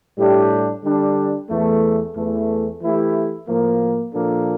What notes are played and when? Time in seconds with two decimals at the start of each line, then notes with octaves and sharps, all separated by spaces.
0.17 A2 G3 D4 G4
0.83 D3 G3 D4
1.48 E2 E3 A3
2.15 E2 E3 A3
2.81 E3 A3 E4 G4
3.47 A2 F3 A#3
4.13 A#2 F3 A#3 D4 A4